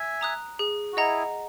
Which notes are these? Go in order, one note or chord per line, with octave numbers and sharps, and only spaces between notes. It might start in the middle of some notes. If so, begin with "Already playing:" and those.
Already playing: E5 G#5
A#5 D#6 F#6
G#4
F#4
E4 G#4 D#5 F#5 A#5